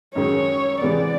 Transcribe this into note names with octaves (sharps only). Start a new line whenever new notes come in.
F#2 D#3 G#3 C#5
C3 E3 G#3 B3 D5